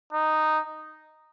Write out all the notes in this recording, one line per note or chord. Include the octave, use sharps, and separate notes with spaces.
D#4